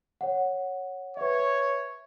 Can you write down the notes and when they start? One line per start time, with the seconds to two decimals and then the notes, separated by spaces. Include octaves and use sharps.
0.21 C#5 F#5
1.17 B4 C#5 E5